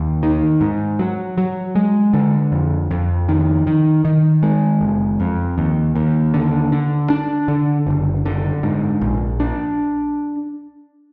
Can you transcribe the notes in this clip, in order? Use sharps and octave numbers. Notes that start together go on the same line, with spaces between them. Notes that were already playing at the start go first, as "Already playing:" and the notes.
Already playing: D#2
D#3
G#2
F#3
F#3
G#3
D3
F2
F2
D#3
D#3
D#3
G#3
F#1
F2
D#2
D#2
D3
D3
D4
D3
F#1
D3
G#2
A#1
D4